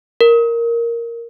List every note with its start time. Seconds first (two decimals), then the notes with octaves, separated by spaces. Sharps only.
0.21 A#4